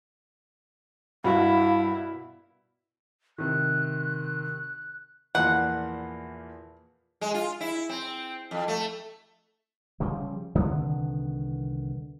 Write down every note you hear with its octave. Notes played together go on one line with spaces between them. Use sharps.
G2 B2 E4 F#4 A#4 F5
C3 D#3 F#6
E2 A#2 F3 F#5
G#3
F4
E4
C4
F2
A3
C#3 F3 G3
C2 D3 D#3 B3